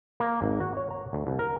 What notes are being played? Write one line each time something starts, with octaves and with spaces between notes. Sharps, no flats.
A#3
G#1
F#4
C#5
A#5
D2
C2
A#4